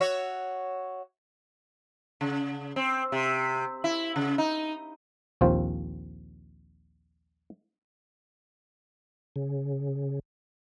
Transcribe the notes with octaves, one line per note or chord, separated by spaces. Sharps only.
F#4 C#5 E5
C#3
C4
C3
E4
C#3
D#4
A#1 D#2 C4 F4 C5
C#3